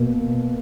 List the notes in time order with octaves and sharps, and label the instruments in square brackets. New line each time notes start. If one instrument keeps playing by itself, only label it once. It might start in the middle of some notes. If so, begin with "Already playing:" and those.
Already playing: [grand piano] B2 A#3